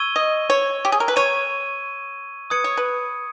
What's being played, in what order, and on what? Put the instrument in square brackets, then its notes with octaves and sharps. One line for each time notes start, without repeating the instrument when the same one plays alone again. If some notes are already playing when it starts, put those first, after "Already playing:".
Already playing: [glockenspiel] C#6 E6 G#6 D#7 G7
[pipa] D#5
C#5
G4
G#4
A#4
B4
[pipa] C#5 [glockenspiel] C#6 G#6 D#7
[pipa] B4 [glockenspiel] D#6 G#6 C#7
[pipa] C#5
B4